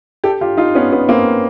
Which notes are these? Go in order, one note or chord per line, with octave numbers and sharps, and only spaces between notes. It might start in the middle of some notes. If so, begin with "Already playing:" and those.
G4 A4
F4 G4
D#4 F4
B3 C#4
B3 C#4
A#3 C4